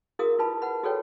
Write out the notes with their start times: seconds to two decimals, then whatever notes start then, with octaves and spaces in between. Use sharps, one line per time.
0.19 E4 F#4 G#4 A#4 F5 D#6
0.39 F4 B4 A5 B5
0.62 B4 F#5 B5
0.83 F#4 G#4 A4 B4 C#5 G5